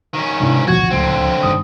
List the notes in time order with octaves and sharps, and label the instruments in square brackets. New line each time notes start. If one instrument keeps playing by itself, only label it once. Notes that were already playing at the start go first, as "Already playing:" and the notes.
[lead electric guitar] D#3 C#4
[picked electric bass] G#2 [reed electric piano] C3 D4 E4
[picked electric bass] A1 D2 B2 [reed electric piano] F3 G#6 [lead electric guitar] F#4
[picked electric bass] D1 C#2 A3 [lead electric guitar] D3 C4
[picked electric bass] G1 D#3 G#3 [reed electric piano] D#6